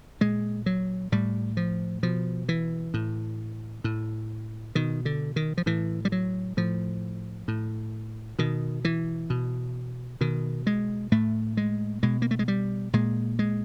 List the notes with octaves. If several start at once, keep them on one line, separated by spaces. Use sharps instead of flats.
A#2 G#3
F#3
A2 G3
F3
B2 F3
E3
A2
A2
B2 D#3
D3
D#3
F3
A2 E3
G3
F#3
A2 F3
A2
B2 D#3
E3
B2
B2 D#3
G#3
A2 A3
G#3
B2 G#3
A#3
A3
G#3
G3
A#2 G#3
G#3